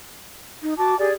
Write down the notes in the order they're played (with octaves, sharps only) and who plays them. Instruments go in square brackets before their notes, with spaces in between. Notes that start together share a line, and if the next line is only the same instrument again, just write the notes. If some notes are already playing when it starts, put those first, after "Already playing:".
[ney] D#4
[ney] F#4 [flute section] A5 D6
[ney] G4 [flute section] G#4 D5